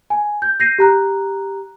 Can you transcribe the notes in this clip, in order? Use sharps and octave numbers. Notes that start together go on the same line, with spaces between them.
G#5
G6
G6 A#6 C7 D#7
G4 A#5 F#6